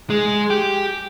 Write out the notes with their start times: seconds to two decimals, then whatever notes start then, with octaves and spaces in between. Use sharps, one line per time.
0.10 G#3
0.50 G4